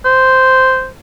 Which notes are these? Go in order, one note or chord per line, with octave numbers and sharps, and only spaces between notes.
C5